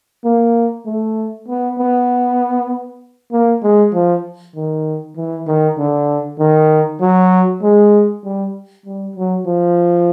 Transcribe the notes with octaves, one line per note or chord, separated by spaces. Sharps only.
A#3
A3
B3
B3
A#3
G#3
F3
D#3
E3
D#3
D3
D#3
F#3
G#3
G3
G3
F#3
F3